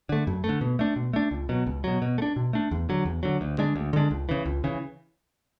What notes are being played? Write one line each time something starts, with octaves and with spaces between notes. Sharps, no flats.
D3 A3
F#2
A3
D3
B2
A3 D4
B2
A3 D4
C#2
B2 F#3
C#2
B2 F#3
B2
A3
D4
B2
A3 D4
E2
D3 F#3
E2
D3 F#3
D2
D3 G#3 D4
D2
D3 G#3 D4
C#2
C#3 E3
C#2
C#3 E3